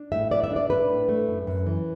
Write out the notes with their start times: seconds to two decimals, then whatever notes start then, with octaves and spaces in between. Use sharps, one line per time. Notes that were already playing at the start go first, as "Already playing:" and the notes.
Already playing: D4
0.12 A2 E5
0.31 B3 D5
0.44 E5
0.51 D4
0.56 D5
0.69 D4 B4
0.89 A2
1.09 A3
1.28 F#2
1.47 F#2
1.66 E3